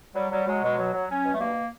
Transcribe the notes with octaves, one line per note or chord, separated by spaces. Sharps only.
F#3 G3
F#3 G3
F#3 G#3
B2 G#3
F#3
F#3
F#3 C#4
B2
A3
G2 A#3